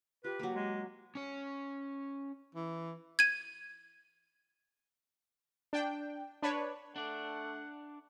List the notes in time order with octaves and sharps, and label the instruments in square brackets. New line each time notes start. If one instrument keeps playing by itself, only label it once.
[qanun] F4 [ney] G4 [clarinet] B4
[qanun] F#3 A#3
[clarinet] G#3
[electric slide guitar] C#4 C#5
[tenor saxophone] E3
[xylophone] G#6 D#7
[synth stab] D4 G5
D4 B4 C#5
[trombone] A3 [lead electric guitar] D4 D5 [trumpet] F#5